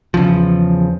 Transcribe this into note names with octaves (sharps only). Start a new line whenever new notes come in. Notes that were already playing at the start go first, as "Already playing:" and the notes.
E2 C#3 F3